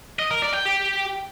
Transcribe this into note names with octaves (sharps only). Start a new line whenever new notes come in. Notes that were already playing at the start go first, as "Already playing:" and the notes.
D#5
A#4
D5
G5
G4